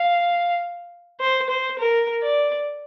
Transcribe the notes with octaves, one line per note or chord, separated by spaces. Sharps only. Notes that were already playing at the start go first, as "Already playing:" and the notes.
Already playing: F5
C5
C5
A#4
D5